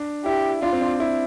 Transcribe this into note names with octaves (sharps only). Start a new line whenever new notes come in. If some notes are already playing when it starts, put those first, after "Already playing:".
Already playing: D4
E4 G4
D4 F4
C4
D4
E4